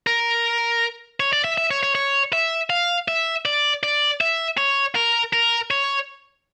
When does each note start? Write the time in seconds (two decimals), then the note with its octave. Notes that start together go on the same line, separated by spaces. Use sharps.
0.07 A#4
1.20 C#5
1.33 D5
1.44 E5
1.58 E5
1.71 C#5
1.83 C#5
1.95 C#5
2.33 E5
2.70 F5
3.08 E5
3.45 D5
3.83 D5
4.21 E5
4.58 C#5
4.95 A#4
5.33 A#4
5.71 C#5